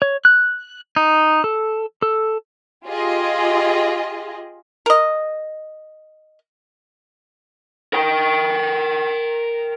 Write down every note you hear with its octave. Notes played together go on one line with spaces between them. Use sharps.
C#5
F#6
D#4
A4
A4
F4 G4 G#4 D#5
A#4 D#5
A#4 G5